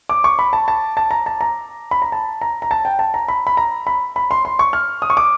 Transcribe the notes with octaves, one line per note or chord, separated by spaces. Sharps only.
D6
C#6
B5
A5
A5
A5
A#5
A5
A#5
B5
A#5
A5
A#5
A#5
A5
G5
A5
A#5
B5
B5
A#5
B5
B5
C6
C6
C#6
F6
D#6
C#6
D6